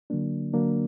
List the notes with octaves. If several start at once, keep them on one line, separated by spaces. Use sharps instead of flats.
D3 F#3 A#3 D4
D3 F#3 A#3 D4